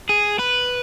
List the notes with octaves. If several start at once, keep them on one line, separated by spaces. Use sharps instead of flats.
G#4
B4